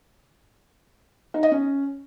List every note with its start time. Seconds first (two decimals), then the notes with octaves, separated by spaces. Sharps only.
1.34 D#4
1.43 D#5
1.52 C#4